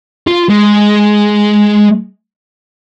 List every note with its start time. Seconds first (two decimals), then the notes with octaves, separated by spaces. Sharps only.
0.27 F4
0.50 G#3